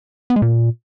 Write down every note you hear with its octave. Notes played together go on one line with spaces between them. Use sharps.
B3
G#3
A#2